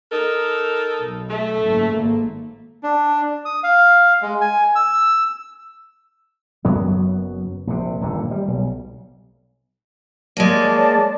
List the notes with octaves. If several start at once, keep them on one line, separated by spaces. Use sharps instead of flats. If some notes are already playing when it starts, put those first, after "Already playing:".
D#4 A4 A#4
B1 B2
A3
F#1 G#2
G#1 A#3
D4
D#6
F5
G#3
G#5
E6
F#1 F#2 F#3 B3
A#1 C3
D#1 G2 A#2 D3
G3
B1
G#3 A#3 C#5 D5 A5